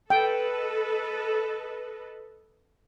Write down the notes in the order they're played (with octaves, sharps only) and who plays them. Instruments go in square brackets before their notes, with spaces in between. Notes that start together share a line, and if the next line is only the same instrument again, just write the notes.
[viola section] A4 B4 D#5 [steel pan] G5